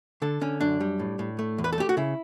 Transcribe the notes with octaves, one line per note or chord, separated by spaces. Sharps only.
D3 A4
D3 C#4
F#2 D4
G3
A2
A2
A3
E2
B4
A4
A3 G4
F#4
C#3 E4